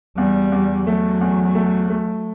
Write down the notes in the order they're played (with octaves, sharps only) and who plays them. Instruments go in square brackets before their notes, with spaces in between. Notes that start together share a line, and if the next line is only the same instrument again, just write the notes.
[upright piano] E2 [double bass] G3
[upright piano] E2
[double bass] F#3 [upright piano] A3
[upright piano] E2
A3
A3